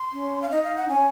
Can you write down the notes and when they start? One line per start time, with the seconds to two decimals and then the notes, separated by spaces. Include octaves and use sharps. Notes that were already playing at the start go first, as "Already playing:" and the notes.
Already playing: C6
0.13 C#4
0.42 F5
0.51 D#4 D#5
0.64 F5
0.76 F#5
0.89 C#4 G#5